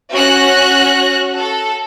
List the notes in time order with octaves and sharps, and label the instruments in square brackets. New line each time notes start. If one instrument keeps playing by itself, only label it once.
[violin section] C#4 F#4 F#6 A#6
A4